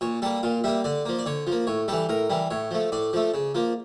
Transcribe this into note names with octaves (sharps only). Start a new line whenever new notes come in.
A#2 C#5
G3 A#3 A4
A#2 F4
G3 A#3 E5
D3 D5
F3 A#3
D5
D3 C#5
F3
A#3
A2 C#5
E3 G3 A4
A2 A#4
E3 G3
A2 C#5
F3 A3
A2 D5
F3 A3
C#3
F3 A#3